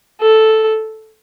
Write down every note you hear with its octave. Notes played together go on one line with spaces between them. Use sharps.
A4